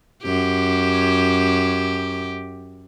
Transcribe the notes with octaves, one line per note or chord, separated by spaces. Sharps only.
F#2 G4